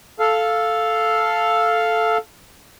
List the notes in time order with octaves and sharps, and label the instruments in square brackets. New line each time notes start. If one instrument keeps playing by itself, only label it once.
[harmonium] A4 F5